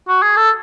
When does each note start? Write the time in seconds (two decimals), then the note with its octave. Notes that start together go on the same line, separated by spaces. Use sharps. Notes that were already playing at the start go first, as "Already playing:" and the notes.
0.08 F#4
0.23 G#4
0.36 A4